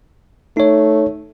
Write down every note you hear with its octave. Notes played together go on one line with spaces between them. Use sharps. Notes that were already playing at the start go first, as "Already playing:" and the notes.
A3 D#4 C#5